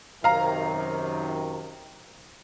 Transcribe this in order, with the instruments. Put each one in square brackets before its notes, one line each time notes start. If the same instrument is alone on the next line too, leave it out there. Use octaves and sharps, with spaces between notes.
[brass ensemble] F#2 C3 D#3 [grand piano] F5 A#5